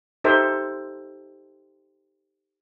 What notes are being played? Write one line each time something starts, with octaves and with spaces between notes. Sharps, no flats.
D#4 G4 A4 A#4 C5 E5